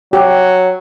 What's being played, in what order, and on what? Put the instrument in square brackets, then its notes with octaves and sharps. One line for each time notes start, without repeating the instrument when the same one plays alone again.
[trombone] F#3 [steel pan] G4